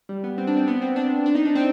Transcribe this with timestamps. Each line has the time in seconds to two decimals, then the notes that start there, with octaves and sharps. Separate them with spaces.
0.09 G3
0.24 B3
0.38 C4
0.47 D4
0.57 C4
0.68 B3
0.82 C4
0.96 D4
1.26 D4
1.35 D#4
1.45 D4
1.55 C4